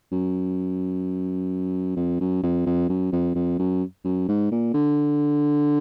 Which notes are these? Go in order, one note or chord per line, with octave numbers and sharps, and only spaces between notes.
F#2
F2
F#2
F2
F2
F#2
F2
F2
F#2
F#2
G#2
A#2
D3